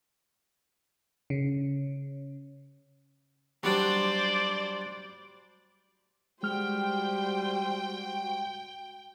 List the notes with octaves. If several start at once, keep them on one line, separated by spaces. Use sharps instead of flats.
C#3
F#3 G3 D4 C5 D5
G3 G#3 F#4 C5 G5 F6